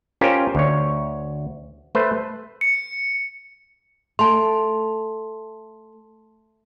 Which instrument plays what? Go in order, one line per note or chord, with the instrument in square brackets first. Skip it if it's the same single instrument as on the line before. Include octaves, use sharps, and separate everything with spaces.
[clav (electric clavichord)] C#4 F4 G4 A#4 C5
D2 C#5
A3 B4 C5
[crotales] C#7
[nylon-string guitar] A3 [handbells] A5 C6